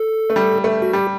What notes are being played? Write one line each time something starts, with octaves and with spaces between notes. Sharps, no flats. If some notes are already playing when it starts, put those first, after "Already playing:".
Already playing: A4
A3
G3
A3
F#4
G3 G4